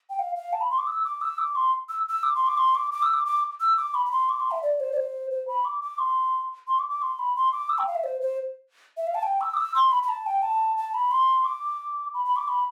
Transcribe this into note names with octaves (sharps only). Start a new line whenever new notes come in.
G5
F5
F5
A5
B5
C6
D6
E6
D6
E6
D6
C6
E6
E6
D6
C6
D6
C6
D6
D6
E6
D6
D6
E6
D6
B5
B5
C6
D6
C6
E5
D5
C5
D5
C5
C5
B5
D6
D6
C6
C6
D6
D6
C6
B5
C6
D6
E6
G5
F5
E5
C5
C5
E5
F5
A5
G5
E6
D6
E6
C6
B5
B5
A5
G5
A5
A5
B5
C6
D6
B5
B5
D6
B5